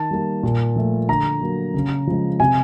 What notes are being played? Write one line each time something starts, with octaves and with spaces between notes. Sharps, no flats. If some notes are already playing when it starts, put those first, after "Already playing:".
Already playing: D#3 A5
G3 A#3
A#2
F3 A3
D3 A#5
F#3 A#3
C#3
F3 G#3
C3 G#5